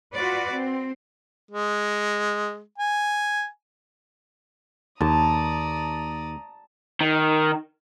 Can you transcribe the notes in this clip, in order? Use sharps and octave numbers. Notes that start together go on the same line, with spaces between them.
F4 F#4 B4 D5
C4
G#3
G#5
D#2 D5 A5 A#5 D#6
D#3